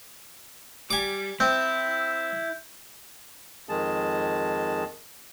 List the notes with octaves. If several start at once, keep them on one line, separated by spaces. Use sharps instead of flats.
G3 G#5 D6
C4 E4 G6
F2 D#3 G#3 G#4 A5